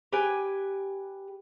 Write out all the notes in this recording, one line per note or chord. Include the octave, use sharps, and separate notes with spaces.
G4 B4 G5 G#5